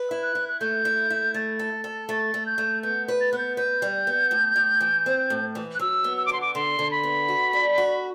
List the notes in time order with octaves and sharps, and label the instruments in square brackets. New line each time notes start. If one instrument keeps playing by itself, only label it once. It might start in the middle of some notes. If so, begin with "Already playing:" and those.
Already playing: [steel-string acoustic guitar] B4
E4
[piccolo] F#6
[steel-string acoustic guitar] E4
[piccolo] F#6
[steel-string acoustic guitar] A3 [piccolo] G6
[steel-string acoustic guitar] E4
E4
[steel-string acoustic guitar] A3 [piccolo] A6
[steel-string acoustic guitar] A4
A4
[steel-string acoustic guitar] A3 [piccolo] A6
[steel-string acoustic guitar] A3
[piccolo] G6
[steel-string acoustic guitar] A3
[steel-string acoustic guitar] B3 [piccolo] G6
[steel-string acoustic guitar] B4
[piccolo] A6
[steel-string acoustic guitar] B3 [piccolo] F#6
[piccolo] G6
[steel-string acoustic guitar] B4 [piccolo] G6
[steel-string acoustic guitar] G3
B3
A2
A2
E3
C4
A2
E3
[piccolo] F#6
[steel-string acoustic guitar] F#3 [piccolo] E6
[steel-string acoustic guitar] B3
[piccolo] E6
D6
[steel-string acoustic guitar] D3 [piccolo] C6
[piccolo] D6
[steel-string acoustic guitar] D3 [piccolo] C6
[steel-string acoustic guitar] D3
[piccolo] B5
[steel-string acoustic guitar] B3
F#4
D4
F#4